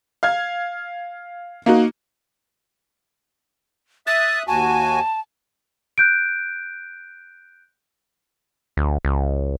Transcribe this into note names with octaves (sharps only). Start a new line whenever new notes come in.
F5 F6 G#6
A#3 D#4 F#4
E5 D#6 F#6 A6
D#2 F#4 G#5 A5
F#6 G6 D7
D2
C#2